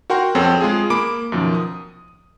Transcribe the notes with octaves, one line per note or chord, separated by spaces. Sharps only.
F#4 A#4 F#5 G5 C6
F2 C4 G#4 A4 C#5 G5
G#3 F4 G#4
A#3 B5 D6 D7
F#2 B2 D#3 F3
D#6